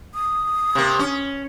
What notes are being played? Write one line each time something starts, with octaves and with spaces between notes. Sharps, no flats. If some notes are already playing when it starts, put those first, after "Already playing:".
D#6
C3 A#3
C#4